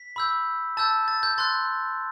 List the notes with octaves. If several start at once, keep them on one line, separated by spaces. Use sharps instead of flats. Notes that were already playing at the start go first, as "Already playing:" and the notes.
Already playing: B6
B5 E6 G6
A5 E6 G6 A6
A6
G6
C6 F#6 A6